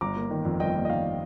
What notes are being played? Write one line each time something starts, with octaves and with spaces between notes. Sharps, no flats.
G1 A#5 D6
A#3
D#3
F2
G1 D#5 G5
A#3
D#5
D#3 D5 F5